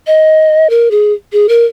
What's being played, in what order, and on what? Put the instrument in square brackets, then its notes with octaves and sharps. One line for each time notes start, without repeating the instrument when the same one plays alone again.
[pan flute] D#5
A#4
G#4
G#4
A#4